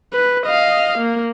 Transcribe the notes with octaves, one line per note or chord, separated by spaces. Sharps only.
B4
D#5 F5
A#3